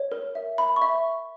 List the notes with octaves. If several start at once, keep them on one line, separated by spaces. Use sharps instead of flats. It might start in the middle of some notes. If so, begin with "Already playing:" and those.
Already playing: C#5
A#4
E5
E5 B5
C#6
E5